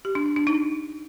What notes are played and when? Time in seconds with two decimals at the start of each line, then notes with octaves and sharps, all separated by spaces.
0.05 G4
0.15 D4
0.26 D4
0.36 D4
0.47 D#4